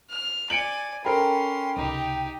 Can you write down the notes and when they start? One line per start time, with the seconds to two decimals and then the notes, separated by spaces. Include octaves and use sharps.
0.10 F6
0.50 D5 G#5 C#7 D7 F#7
1.05 C#4 A4 A#4 G5 B5 C6
1.77 C#2 C3 D#4 G4